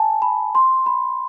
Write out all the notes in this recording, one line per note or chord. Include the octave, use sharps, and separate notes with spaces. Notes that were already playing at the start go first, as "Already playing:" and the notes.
Already playing: G#5 A5
B5
C6
B5